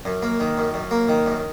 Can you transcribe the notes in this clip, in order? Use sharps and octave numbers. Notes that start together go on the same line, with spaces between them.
F#2
A#3
D#3
F#2
F#2
A#3
D#3
F#2